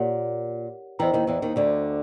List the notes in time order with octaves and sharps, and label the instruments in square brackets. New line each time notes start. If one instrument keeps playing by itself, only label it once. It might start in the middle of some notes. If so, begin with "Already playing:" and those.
Already playing: [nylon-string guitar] A#2 [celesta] G4 A#4 C#5 F#5
[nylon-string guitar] E2 E3 [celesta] C5 D#5 G5 A#5
[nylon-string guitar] D#2 D#3
E2 E3
D#2 D#3
D2 D3